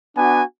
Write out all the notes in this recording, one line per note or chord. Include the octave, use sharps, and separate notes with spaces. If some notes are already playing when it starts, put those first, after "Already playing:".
B3 D4 F#4 G#5